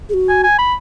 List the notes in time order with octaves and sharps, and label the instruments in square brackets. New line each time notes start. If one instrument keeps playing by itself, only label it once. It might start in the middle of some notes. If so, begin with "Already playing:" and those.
[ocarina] G#4
F#4
[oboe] G#5
G#5
B5